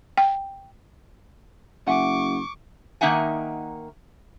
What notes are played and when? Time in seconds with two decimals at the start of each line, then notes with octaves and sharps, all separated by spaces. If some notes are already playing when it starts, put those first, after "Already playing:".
0.18 G5
1.87 F#1 E5 F#5 G#5 C#6 D6
3.01 D#3 A#3 D#4 E5 F#5 G#5